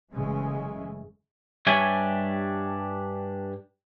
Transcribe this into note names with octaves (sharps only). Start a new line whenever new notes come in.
F#1 C#3 E3 G#3 A3
G2 G3 D4 C#5 E5 G#5